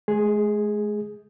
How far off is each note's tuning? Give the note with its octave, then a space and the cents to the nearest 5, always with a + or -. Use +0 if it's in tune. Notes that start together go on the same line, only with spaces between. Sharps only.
G#3 +40 G#4 +0